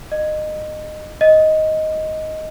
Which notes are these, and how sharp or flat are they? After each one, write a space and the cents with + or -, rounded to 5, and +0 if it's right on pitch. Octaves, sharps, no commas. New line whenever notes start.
D#5 -20
D#5 +10